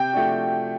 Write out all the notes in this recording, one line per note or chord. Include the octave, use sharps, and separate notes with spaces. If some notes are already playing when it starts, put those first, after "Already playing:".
Already playing: C3 G5
F3 A3 D4 F#4